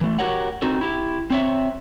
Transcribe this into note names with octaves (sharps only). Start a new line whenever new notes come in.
E3 A3
F#4 G4 A#4 C#5 F#5
C4 D#4 F#4 A4
E4 G4
C4 C#5 E5